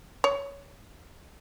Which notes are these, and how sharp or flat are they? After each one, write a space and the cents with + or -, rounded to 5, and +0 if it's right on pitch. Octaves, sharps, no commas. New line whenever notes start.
C#5 +15